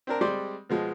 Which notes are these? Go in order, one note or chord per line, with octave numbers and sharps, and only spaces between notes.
C4 D4 A#4
G3 G#3 C4 D5 C6
B2 F3 G#3